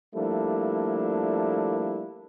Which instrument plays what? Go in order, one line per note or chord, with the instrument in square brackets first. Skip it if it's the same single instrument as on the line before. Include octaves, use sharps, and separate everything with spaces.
[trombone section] F3 G3 A3 A#3 D4 E4